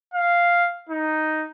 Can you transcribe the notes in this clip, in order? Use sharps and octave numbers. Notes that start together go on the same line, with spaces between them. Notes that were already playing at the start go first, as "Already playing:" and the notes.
F5
D#4